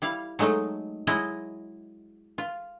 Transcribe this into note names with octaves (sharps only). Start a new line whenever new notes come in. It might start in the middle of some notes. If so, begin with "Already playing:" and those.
G3 E4 F5
F#3 G#3 A3 D#4
F#3 G#3 E4 D#5
F4